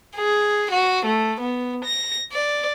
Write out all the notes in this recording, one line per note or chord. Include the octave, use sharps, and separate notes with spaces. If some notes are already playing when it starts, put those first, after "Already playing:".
G#4
F#4
A3
B3
A#6
D5